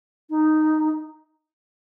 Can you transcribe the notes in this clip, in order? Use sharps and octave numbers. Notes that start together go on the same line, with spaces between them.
D#4